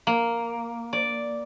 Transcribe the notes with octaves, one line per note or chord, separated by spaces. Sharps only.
A#3
D5